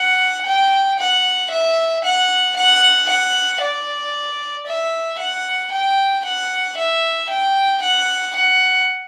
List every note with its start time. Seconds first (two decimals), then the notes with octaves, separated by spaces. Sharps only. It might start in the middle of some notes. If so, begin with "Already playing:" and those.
Already playing: F#5
0.46 G5
0.99 F#5
1.51 E5
2.04 F#5
2.56 F#5
3.09 F#5
3.61 D5
4.67 E5
5.19 F#5
5.72 G5
6.25 F#5
6.77 E5
7.30 G5
7.82 F#5
8.35 F#5